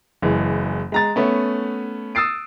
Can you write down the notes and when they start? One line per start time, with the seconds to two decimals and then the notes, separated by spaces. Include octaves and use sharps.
0.22 F#1 E3 G#3
0.92 G#3 A#5 A6
1.16 A3 B3 C#4
2.15 D#6 E6 A6 C7 D7